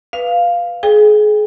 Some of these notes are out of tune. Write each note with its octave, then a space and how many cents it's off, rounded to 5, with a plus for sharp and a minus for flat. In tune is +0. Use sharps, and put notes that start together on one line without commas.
B4 +0 F5 +0
G#4 +30 G5 +40